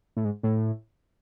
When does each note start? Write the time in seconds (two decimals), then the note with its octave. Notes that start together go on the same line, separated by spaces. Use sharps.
0.17 A2
0.25 G#2
0.43 A2